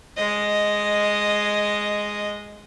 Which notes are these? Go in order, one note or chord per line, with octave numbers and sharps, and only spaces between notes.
G#3 D#5